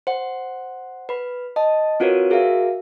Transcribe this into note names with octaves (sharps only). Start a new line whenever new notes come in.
C5 F#5
B4 B5
D#5 A5
C4 F4 F#4 A#4 B4 C#5
F#4 G#4 A#4 E5 F5